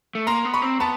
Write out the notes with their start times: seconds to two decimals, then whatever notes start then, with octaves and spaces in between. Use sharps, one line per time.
0.15 A3
0.27 A#3 A#5 C6
0.45 B3
0.54 B5 C#6
0.62 C4
0.80 B3 A5 B5